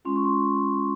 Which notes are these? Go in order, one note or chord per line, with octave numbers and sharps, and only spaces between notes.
G#3 C#4 F4 C6
C#6
C6